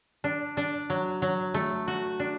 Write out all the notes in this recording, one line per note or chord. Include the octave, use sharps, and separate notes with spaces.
D4
D4
F#3
F#3
A3
F#4
D4